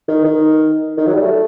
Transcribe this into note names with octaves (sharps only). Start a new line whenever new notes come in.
D#3
D#3
D#3
F#3
G3
A3